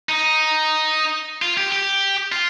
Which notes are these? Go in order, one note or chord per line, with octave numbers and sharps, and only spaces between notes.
D#4
F4
G4
G4
F4